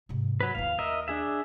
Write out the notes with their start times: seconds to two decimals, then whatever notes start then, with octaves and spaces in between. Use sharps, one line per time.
0.09 G#2 C3
0.41 F#3 B4
0.55 D#2 E4 F5
0.79 A#4 D#5 E5
1.08 D4 G#4 E5